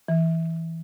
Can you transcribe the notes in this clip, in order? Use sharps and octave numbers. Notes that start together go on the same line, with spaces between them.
E3